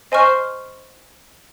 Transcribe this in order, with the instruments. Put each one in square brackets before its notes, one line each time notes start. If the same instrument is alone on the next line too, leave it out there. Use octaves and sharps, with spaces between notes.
[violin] C5 [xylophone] D#5 G#5 C#6 F6